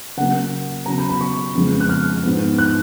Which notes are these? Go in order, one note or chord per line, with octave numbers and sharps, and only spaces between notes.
C#3 F#3 A#3 F#5
C#3 F#3 B3 A#5
B5
B5
C#6
F2 C#3 F3 G#3 B3
F#6
F6
G#2 F3 B3
F#6